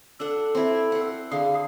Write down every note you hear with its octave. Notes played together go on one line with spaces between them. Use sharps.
D4 A4 F#5
C4 E4
C5 F#5
D3 G#4 F5